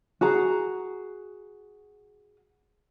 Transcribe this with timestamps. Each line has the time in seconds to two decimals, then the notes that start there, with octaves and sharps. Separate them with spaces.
0.21 F#4 G#4 A#5